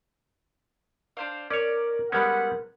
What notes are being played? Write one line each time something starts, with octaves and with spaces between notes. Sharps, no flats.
D4 C5 F5
C#4 A#4 C#5 D5
G3 G#3 B3 C#4 A#4 F#5 B5